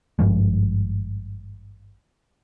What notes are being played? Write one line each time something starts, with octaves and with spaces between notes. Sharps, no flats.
G#1 G2 F3 G#3